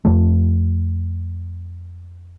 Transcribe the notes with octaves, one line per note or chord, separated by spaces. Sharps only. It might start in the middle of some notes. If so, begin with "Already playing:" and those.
F2 F3 A3